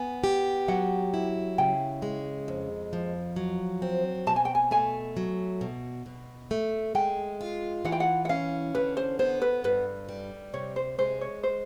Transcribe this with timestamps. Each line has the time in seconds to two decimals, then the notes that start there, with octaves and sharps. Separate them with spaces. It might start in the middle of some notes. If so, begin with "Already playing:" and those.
Already playing: B3 G#5
0.24 G4
0.68 F#3 F#5
1.14 E4
1.58 C#3 G5
2.02 G#3
2.48 F2
2.93 F3
3.36 F#3
3.82 C4
4.27 B2 A5
4.36 G#5
4.45 G5
4.55 G#5
4.71 A3 G#5
5.17 F#3
5.61 B2
6.06 B2
6.51 A3
6.95 G#3 G5
7.41 F4
7.85 E3 F#5
7.92 G5
8.00 F#5
8.25 F#5
8.29 C#4 F5
8.75 D3 B4
8.97 C5
9.19 B3 C5
9.42 B4
9.64 G2 B4
10.09 G3
10.54 C3 C#5
10.76 C5
10.99 G#3 C5
11.21 C#5
11.43 C5